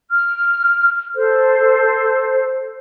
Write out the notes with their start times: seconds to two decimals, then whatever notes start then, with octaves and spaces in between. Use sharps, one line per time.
0.11 F6
1.15 A4 C5